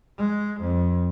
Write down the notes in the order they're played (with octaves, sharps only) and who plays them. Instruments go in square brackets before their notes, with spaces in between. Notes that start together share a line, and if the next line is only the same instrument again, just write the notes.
[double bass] G#3
F2